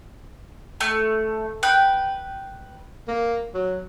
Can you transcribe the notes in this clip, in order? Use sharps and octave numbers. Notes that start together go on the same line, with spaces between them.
A3
B4 G5
A#3
F#3